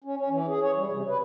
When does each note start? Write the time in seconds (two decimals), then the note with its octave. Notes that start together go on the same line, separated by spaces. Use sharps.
0.04 C#4
0.17 C#4
0.30 E3
0.48 G#4
0.61 C#5
0.77 G3
0.90 C3
1.09 B4